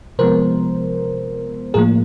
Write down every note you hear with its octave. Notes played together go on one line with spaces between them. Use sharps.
C3 F3 G#3 B3 A#4 C5
A2 F3 A#3 G#4 A#4